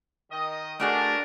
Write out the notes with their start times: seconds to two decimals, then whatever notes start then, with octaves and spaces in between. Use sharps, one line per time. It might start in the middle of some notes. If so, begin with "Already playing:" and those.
0.30 D#3 D#5
0.80 A3 D4 F#4 G#4 A#4